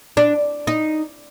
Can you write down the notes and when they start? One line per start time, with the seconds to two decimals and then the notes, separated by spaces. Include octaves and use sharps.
0.17 D4
0.67 D#4